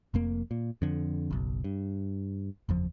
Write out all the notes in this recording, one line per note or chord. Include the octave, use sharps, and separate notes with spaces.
F1 F2 A#3
A#2
F2 D3
F#1 B1
G2
F#1 E2 F3